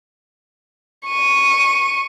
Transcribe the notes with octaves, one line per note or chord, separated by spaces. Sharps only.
C#6 D#7